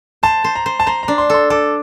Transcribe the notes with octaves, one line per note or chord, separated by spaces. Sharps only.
C5 A5
C5
A#5
C5
A5
C5 A#5
A#5
D4
C6
A4 C6
A4 D6